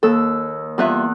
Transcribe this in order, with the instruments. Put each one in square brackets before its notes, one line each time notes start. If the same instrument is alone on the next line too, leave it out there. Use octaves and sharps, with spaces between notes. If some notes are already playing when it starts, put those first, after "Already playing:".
[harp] D#2 E6 [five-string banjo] A4
[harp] E2 F#6 [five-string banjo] G3 F4 E5